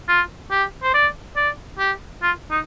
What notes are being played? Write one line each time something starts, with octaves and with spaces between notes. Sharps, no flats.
F4
G4
C5
D5
D5
G4
F4
D#4